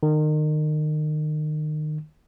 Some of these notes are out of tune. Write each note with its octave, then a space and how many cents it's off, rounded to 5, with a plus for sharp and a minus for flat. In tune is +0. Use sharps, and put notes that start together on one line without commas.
D#3 -30